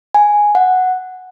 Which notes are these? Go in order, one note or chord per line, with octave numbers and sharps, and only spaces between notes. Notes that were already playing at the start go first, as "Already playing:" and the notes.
G#5
F#5